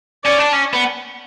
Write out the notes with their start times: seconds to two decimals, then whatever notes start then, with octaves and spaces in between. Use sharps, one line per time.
0.24 C#4 D5
0.39 D4
0.53 C#4
0.73 B3